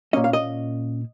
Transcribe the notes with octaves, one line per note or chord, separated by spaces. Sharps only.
A#2 A#3 C#4 D#5
F5
D#5